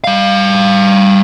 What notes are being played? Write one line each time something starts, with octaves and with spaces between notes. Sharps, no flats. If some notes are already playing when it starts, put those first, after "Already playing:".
G3 F5